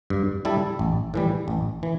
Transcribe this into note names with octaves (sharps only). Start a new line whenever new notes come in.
G2
G3 E4 A4
A1
A2 E3 G3
A1
E3